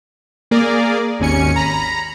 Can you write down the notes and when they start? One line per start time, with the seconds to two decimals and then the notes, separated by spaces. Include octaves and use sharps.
0.51 A#3 G#4 A#4 D5
1.19 G#1 D#2 C#4 G#5 C#7
1.56 A#5 B5